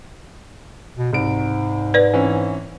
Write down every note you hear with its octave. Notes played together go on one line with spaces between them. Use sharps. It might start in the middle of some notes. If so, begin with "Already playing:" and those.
B2
C2 G#2 D7
B4 D5
E3 C4 C#4